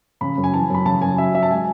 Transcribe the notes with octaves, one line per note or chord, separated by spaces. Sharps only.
C#3 B5
F#2
G#5
E3 A5
F#2 B5
C#3 A5
F#2 G#5
F#3 E5
F#3 E5
A5
G#3 G#5